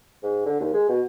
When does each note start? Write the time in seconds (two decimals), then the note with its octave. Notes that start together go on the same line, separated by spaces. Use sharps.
0.23 G#2
0.46 D3
0.60 D#2
0.73 G#3
0.89 B2